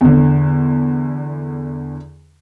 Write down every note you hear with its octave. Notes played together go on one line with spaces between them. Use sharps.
E2 D3